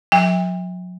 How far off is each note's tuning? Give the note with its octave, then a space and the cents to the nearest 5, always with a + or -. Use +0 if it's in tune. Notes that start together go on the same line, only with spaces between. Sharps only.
F#3 -40 G5 +45